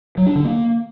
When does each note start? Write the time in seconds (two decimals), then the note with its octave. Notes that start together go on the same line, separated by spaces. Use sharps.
0.17 F#3
0.26 D4
0.35 D3
0.45 A#3